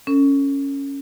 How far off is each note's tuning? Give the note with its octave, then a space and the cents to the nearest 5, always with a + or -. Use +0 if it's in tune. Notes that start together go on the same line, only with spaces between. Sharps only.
C#4 +0 A4 +40